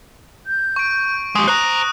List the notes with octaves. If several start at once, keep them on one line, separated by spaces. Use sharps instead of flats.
G6
C#6 D7
G#3 G4 D#6
C5 A#5 F#6 A#6